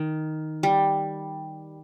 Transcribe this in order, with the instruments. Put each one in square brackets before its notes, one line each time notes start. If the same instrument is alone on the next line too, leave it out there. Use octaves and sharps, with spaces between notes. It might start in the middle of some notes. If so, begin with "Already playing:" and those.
Already playing: [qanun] D#3
G3